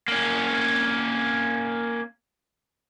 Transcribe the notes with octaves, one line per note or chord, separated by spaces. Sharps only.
A#3 C#4